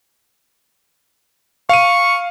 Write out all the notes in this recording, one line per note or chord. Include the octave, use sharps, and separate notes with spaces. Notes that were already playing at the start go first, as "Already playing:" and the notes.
F5 C#6 D#7